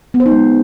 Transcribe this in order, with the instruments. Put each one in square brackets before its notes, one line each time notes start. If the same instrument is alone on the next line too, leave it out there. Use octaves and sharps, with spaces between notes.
[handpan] B3
C5
D#4
G#3